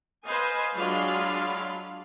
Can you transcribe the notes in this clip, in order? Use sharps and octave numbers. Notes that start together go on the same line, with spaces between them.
B4 C5 D#5 F5 G#5
F#3 G#3 D4 F4 F5 B5